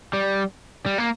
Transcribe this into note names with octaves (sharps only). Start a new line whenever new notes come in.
G3
G3
A#3